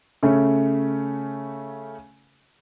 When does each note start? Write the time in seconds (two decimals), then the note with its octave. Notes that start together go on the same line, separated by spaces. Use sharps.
0.23 C#3 A3 C#4